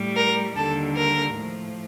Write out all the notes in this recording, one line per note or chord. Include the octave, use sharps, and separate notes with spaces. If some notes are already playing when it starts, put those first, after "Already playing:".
Already playing: A2 G3
A#4
D#2 D3 G3 A4
A#4
A2 F3